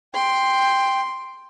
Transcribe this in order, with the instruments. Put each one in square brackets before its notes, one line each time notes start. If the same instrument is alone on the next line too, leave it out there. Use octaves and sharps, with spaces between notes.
[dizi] G5 [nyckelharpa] C6